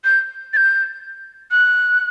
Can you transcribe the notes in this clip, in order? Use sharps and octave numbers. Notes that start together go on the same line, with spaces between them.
G6
A6
G6
F#6